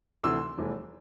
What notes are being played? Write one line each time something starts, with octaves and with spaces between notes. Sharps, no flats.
D2 C3 E3 A3 C6 E6
F1 E2 E3 A3